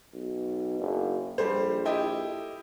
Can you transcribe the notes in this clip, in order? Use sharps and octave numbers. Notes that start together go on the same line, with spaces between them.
B1
F#1
A#1 G3 A4 C5
E4 G4 D#5